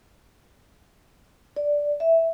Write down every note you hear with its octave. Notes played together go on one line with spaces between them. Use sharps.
D5
E5